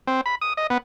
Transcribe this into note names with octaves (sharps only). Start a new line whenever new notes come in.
C4
B5
D#6
D#5
B3